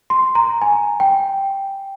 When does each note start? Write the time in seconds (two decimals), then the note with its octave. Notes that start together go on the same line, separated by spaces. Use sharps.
0.10 C6
0.35 A#5
0.62 G#5
1.00 G5